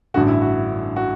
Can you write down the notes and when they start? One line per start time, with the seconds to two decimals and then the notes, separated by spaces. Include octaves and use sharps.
0.14 A1 G2 D3 F#4
0.28 E4
0.42 F#4
0.96 F#4